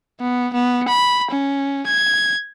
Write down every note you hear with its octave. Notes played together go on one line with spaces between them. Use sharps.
B3
B3
B5
C#4
G#6